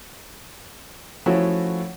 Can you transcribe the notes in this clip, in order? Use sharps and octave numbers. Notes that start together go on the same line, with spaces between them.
F3 A3 C#4 E4 F#4